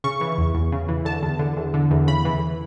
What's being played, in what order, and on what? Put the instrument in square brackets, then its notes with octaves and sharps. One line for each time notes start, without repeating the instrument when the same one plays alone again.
[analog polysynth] C#3 C#6
E3
E2
E2
C#3
E3
D3 A5
E2
D3
E2
D3
E2
C#3 B5
E3